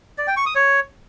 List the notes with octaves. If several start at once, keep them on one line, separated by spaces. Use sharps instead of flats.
D5
G5
C#6
D#6
C#5